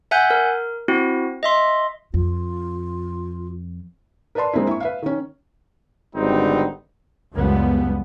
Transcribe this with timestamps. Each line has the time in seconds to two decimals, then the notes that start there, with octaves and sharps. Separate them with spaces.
0.11 E5 F#5 G#5 F#6 G6
0.30 A#4
0.88 C4 E4 F#4
1.43 D#5 E5 C6
2.14 F2 F4
4.35 A#4 B4 D5 A5 C6
4.53 G#3 A#3 C4 D4 E4
4.67 E4 C#6
4.80 B4 E5 F5
5.02 D#3 C#4
6.15 G#1 D3 G3 B3 C4 D#4
7.33 C#2 F#2 F3 G3 B3